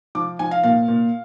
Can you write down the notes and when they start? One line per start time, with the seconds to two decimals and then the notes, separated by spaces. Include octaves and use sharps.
0.15 F3 D6
0.39 F3 G#5
0.51 F5
0.63 A#2 F5
0.88 A#2